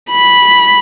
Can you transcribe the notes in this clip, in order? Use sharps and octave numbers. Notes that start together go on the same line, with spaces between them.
B5